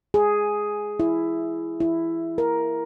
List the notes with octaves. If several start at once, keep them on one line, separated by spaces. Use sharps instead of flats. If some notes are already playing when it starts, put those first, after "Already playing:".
G#4
E4
E4
A#4